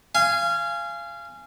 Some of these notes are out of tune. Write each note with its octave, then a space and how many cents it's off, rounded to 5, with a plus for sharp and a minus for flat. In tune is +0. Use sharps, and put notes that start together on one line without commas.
F5 -25 G#5 +0